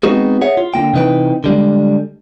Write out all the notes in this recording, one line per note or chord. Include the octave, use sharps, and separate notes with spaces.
G#3 B3 C4 D#4 F#4 G#4
G#4 C#5 E5 F#5
F4
D3 A#3 G5
C3 E3 D#4 B4 G5
D3 G3 G#3